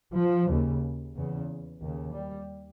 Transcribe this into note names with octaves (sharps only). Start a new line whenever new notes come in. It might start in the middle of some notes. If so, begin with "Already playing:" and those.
F3
D#2 C#3
E2 C#3
D#2 C#3
G3